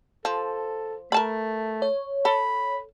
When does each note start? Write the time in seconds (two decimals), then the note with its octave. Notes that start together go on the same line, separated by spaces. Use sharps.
0.25 F3 A4
1.12 A3 A#4 A5 B5
1.82 C#5
2.25 A4 B5